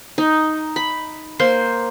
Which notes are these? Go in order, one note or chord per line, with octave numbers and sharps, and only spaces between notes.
D#4
B5
A#3 C5 C6